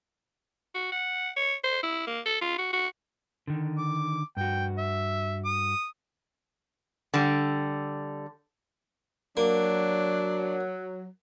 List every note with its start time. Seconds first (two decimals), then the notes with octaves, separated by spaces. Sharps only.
0.75 F#4
0.92 F#5
1.36 C#5
1.64 C5
1.83 E4
2.07 A#3
2.26 A4
2.41 F4
2.58 F#4
2.73 F#4
3.47 D3 D#3
3.78 D6
4.37 G2 F#4 G5
4.78 E5
5.45 D#6
7.14 D3 G3
9.37 F#3 A#3 D4